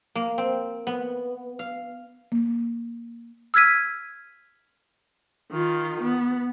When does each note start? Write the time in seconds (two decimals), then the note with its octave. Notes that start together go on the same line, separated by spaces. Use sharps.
0.15 A#3
0.38 C4
0.87 B3
1.59 F5
2.32 A#3
3.54 E6 F6 G#6 B6 D#7
5.52 D#3 F4
6.03 B3